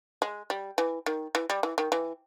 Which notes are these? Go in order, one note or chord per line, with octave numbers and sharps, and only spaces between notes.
G#3
G3
E3
D#3
E3
G3
E3
D#3
E3